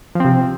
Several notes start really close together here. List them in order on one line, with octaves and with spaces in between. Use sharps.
F3 C4 C3